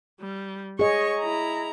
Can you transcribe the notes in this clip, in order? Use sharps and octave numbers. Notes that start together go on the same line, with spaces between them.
G3
G#4 C#5 D#5 C#6
E4 A#5